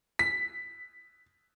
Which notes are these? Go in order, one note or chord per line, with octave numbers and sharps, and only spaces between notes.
B6